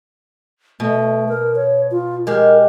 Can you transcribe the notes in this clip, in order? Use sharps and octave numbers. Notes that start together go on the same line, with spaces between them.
B2 A3
A#4
C#5
F4
G#3 G4 A#4